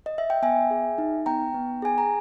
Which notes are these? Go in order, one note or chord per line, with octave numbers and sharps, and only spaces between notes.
D#5
E5
G5
B3 E5 G#5
G#4
D#4
B3 G5 A#5
B3
G#4 G#5
A#5